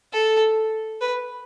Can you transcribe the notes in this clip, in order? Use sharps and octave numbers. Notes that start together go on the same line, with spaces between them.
A4
B4